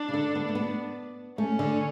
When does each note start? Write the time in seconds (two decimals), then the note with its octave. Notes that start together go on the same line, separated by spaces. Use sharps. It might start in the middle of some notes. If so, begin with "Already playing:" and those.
Already playing: D4
0.08 C#3
0.13 D3
0.35 B3
0.48 A3
0.55 B3
1.38 A3 C#4
1.59 D3